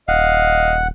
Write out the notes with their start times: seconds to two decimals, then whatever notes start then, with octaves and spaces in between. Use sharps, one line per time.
0.08 D#1 D#5 F5 F#5